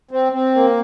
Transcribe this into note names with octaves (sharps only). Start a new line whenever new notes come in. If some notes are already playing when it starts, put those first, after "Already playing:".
C4
C4
A#3